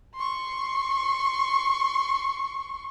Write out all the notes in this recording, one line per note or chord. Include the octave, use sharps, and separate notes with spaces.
C6 C#6